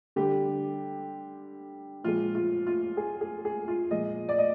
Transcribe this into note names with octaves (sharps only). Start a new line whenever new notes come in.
D3 G3 G4
A#2 F3 G#3 F4
F4
F4
G#4
G#4
G#4
F4
A#2 F3 G#3 D#5
D5
D#5